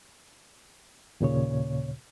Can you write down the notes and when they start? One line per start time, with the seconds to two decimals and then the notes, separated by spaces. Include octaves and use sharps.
1.20 D#2 A#2 C#3 C#5